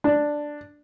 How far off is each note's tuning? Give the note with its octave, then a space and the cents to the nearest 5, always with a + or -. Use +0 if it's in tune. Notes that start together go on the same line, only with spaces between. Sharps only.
D4 +5